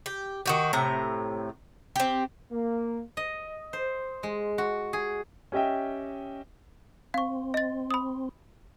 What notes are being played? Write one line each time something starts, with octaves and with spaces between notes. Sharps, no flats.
G4
D#3 F#4 G4
A2 C3 A#5
C4 G4
A#3
D#5
C5
G#3
F#4
G#4
C#4 G4 D#5 E5 G5
C4 F5 C#6
D#5 A6
B5 D#6